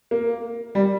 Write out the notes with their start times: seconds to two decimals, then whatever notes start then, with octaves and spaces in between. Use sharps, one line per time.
0.11 A#3
0.75 G3